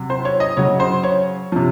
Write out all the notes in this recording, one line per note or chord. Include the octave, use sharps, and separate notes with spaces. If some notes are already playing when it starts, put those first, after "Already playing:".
Already playing: C3 F#3
C5
C#5
D#5
C#3 F#3 C#5
C5
C#5
C3 F3